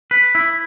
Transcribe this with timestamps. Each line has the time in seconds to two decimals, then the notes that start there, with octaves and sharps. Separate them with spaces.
0.11 B4
0.35 E4